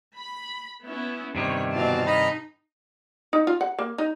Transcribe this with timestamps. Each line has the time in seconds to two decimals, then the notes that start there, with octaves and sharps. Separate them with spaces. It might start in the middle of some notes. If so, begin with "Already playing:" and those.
0.17 B5
0.86 B3 C#4 E4
1.35 G2 C3 D#3 C#5
1.73 B2 E3 C4 F5 A5
2.07 D#4 D#5 A#5 B5
3.33 D#4
3.47 F4
3.61 F#5
3.79 A#3
3.98 D#4